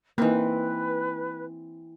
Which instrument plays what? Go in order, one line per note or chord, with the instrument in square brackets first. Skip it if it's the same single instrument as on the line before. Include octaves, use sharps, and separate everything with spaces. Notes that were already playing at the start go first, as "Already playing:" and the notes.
[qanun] E3 C4 [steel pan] A#3 D#4 [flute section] B4